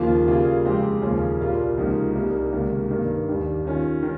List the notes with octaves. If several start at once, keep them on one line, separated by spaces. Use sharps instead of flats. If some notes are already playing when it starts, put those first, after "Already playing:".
Already playing: D#2 C#3 F3 A#3 F4
C#3 G3 A#3 F4 G#4
F2 C#3 G#3 C4 G4
D#2 C#3 F3 A#3 C#4
C2 A#2 G3 A#3 F4
C#2 C3 F3 A#3 D#4
C2 C3 G3 A#3 D#4
C#2 C3 D#3 A#3
G2 D#3 A#3
D#2 D#3 G3
D#3 G3 C#4 F4
D#3